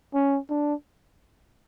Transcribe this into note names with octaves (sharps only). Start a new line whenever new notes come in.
C#4
D4